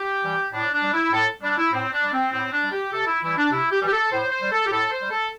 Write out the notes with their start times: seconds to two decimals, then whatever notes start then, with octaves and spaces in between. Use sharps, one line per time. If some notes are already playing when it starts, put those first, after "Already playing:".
Already playing: G4
0.23 E3 G3
0.53 A2 D4
0.73 D4
0.83 G3
0.93 E4
1.12 A2 A4
1.42 G3 D4
1.58 E4
1.72 A2 C4
1.92 D4
2.03 G3
2.13 C4
2.32 A2 C4
2.53 D4
2.63 G3
2.72 G4
2.93 C3 A4
3.07 E4
3.23 E3 G3 E4
3.37 D4
3.51 C3 E4
3.72 G4
3.82 E3 G3
3.87 G4
3.92 A4
4.12 A2 C5
4.31 C5
4.42 G3
4.52 A4
4.67 G4
4.71 A2 A4
4.91 C5
5.01 G3
5.11 A4